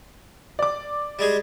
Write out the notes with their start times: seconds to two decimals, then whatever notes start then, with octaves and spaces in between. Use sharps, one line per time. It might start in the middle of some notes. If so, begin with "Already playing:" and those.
0.59 D5 D6
1.19 G3 G#3 G#4